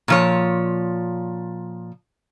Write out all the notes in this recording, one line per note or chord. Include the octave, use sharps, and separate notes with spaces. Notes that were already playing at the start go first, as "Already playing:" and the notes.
A#2 F3 C#5